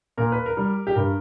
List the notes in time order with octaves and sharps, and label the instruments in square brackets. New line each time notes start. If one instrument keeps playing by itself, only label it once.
[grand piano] A#2 A#4
B4
A#4
G3
G4
G2 A#4